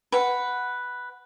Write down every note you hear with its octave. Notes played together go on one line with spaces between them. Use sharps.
B4 F#5